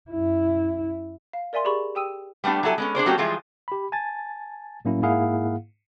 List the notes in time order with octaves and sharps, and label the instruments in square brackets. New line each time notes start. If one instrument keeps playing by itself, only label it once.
[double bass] F#2 E4
[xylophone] F5
A#4 D5 E5 G#5 C6
G4 G#4 D5 B5 C#6
G4 G5 D#6 E6 D#7
[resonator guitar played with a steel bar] G3 A3 B3 D4 G4
F#3 G3 E4 A4 G#5
G#3 B3 C#4
D4 G#4 C5 D5
F#3 A3 A#3 C#4 F#4 G4
E3 F3 G3 G#3 F4 G#4
[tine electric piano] G4 B5
G#5 A5 A6
A2 F#3 A#3 C#4 E4
G#2 A#3 E4 G#4 F5 F#5